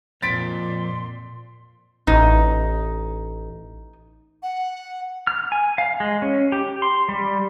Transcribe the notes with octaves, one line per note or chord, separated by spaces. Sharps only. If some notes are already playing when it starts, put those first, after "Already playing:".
F2 A#2 C6 A6 B6 D7
A1 D#4
F#5
F6
G#5
F5
G#3
C#4
G4
C6
G3